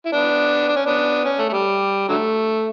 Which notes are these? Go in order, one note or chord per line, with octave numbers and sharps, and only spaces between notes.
E4
B3 D4
D4
C#4
B3 D4
C#4
A3
A3
G3
D3 F#3 A3